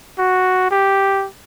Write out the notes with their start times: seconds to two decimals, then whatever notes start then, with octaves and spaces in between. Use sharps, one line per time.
0.18 F#4
0.71 G4